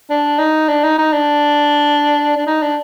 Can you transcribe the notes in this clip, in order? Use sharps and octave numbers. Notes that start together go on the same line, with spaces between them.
D4
D#4
D4
D#4
D#4
D4
D4
D#4
D4